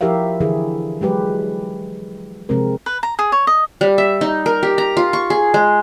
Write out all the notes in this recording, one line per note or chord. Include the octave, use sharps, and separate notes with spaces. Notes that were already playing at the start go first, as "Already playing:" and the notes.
F3 E4 G4 A#4 E5 F5
D3 E3 E4 G#4
F#3 G#3 G4 B4
C3 F3 G#3 C4 A#4
B4
A#5
G#4
C#5
D#5
G3
E5
D#4
A#4
G4
A#5
F4
C#6
G#4
G#3